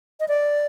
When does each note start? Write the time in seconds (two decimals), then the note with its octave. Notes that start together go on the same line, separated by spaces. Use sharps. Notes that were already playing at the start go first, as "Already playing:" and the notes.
0.20 D#5
0.28 D5